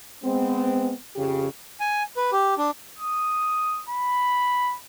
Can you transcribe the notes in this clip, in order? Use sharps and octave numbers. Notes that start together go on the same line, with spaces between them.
G#3 B3 C4
F2 C#3 G4
G#5
B4
G4
D4
D#6
B5